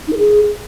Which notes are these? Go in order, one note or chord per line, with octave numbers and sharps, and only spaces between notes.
D#4
A#4
G#4